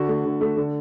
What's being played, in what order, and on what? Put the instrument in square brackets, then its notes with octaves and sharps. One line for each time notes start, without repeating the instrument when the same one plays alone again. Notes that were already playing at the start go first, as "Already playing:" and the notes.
Already playing: [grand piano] D3 F#4
A3
D3
A3
D3